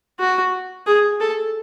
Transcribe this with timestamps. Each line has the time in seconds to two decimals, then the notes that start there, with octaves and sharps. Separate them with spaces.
0.20 F#4
0.87 G#4
1.20 A4